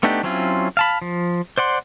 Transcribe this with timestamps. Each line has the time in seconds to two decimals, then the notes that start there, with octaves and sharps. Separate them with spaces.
0.03 A3 B3 D4 D#4 G4
0.23 F#3 C4 C#4 E4 F4
0.77 F5 A5 B5
1.02 F3
1.58 C5 D5 F#5 C6